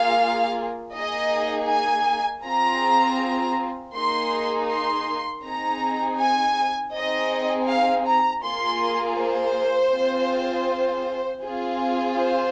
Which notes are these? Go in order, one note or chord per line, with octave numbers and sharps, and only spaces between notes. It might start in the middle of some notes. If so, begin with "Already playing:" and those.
Already playing: A#3 F4 G#4 F5
A#3 D#4 G#4 D#5
G#5
C4 F4 G#4 A#5
A#3 D#4 G#4 C6
C6
C4 D#4 G#4 A#5
G#5
C4 D#4 G#4 D#5
F5
A#5
A#3 F4 G#4 C6
C5
C4 F4 G#4
C4 F4 G#4
C5